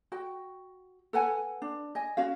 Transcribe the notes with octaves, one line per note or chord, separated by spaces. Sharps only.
F#4 G5
A4 B4 F#5 G#5
D4
D#5 G#5
C#4 F#4 F5